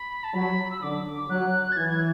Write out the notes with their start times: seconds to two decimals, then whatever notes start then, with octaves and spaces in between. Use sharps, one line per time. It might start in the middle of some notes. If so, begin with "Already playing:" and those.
Already playing: B5
0.24 A5
0.34 F#3 B5
0.71 E6
0.82 D3 D6
1.29 F#3 F#6
1.72 A6
1.77 E3 G#6
1.89 G#6